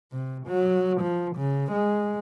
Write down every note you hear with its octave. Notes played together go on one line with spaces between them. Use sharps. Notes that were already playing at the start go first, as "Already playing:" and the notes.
C3
F#3
F3
C#3
G#3